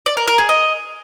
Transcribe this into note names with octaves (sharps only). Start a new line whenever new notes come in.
D5
A#4
A#4
G#4
D#5